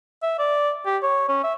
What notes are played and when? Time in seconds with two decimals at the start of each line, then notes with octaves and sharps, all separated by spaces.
0.23 E5
0.39 D5
0.86 G4
1.03 C#5
1.29 C#4
1.44 E5